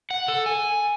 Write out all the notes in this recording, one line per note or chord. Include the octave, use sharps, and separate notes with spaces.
F#5
A4
G#5